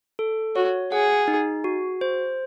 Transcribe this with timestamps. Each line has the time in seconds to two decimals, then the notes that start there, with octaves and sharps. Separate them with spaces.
0.19 A4
0.56 F#4 C#5
0.92 G#4 F#5
1.28 D#4
1.64 F#4
2.01 C5